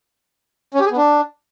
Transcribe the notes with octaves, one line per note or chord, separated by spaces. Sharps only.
C#4
G4
G#4
B3
D4